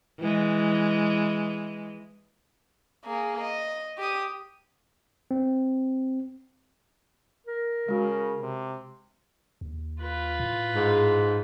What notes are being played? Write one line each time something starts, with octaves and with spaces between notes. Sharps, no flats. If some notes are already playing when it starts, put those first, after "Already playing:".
E3 G#3
A#3 G#4
D#5
G4 D#6
C4
A#4
C#3 G#3 F#4
C3
D#2
F4 B4
A2
G#2